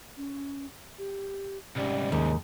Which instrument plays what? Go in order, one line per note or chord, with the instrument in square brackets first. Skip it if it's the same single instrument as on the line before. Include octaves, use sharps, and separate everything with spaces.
[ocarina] C#4
G4
[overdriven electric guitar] C2 G#2 [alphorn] G3 [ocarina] C#4
[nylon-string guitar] D#2 [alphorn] G#3